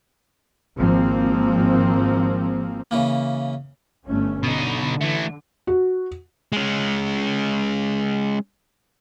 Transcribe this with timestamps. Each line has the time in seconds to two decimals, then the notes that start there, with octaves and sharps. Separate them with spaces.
0.76 G#1 F3 A#3 C4
2.91 C#3 E3 A#3
4.07 G1 A3 C#4
4.43 B2 D3 D#4
5.01 E3 A3
5.67 F#4
6.52 G#3 C#4